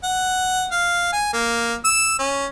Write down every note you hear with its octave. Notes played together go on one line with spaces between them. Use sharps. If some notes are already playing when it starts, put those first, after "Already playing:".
F#5
F5
G#5
A#3
E6
C#4